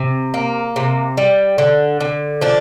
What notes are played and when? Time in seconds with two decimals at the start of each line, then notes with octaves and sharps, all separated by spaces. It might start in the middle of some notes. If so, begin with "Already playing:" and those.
Already playing: C3
0.34 A#3
0.76 C3
1.17 G3
1.58 D3
2.00 D3
2.41 F3 D4